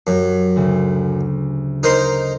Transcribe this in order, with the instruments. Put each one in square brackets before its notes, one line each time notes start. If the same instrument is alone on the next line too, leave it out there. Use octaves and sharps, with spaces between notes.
[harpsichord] F#2 [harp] F#3 G4
[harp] D2 C#3
[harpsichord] D#4 A#4 C5